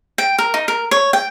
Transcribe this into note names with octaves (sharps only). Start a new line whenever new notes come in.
G5
A#4
D#4
A#4
C#5
G5